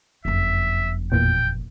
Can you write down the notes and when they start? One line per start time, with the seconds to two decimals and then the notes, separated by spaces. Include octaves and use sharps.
0.25 F#1 F2 E5
1.12 A1 E2 A#2 G5